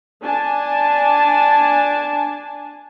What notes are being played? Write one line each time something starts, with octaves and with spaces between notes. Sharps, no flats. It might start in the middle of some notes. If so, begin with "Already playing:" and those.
D4 G#5 A5